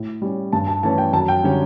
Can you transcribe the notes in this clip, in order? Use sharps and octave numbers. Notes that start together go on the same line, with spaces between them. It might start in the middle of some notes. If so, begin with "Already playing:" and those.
Already playing: A2
G3 C#4
G2 A5
A5
E3 A3 C#4 A5
G5
F#2 A5
G5
D3 G3 C#4